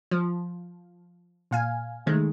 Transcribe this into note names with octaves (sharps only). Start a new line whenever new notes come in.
F3
A#2 F5 G#5
C2 D#3 G#3 A3